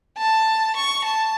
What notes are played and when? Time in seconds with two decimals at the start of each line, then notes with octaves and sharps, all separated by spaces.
0.17 A5
0.76 C#6
1.04 A5